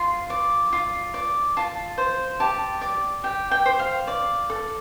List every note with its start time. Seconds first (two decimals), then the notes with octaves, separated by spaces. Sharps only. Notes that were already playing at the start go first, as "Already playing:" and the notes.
Already playing: F4 C6
0.30 D5
0.73 F4
1.14 D5
1.57 F4 A5
1.98 C5
2.40 G4 A5
2.81 D5
3.24 G4 G5
3.51 G5
3.65 C5
3.79 F5
4.07 D5
4.50 A4